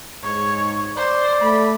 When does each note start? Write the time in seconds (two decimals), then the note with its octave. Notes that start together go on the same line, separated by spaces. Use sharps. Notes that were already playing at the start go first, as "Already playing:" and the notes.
0.23 G#2 C#5
0.97 C5 D5
1.41 A3 B5